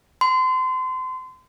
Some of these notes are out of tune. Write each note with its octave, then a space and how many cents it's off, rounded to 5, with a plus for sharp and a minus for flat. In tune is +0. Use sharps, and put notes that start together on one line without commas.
C6 -30